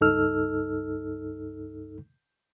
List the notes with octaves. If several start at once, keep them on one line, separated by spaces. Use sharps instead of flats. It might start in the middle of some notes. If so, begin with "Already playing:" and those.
C#2 G2 D#4 A4 E6 F6